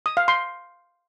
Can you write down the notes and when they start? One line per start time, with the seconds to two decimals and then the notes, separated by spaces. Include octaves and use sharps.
0.06 D#6
0.17 F5
0.28 C6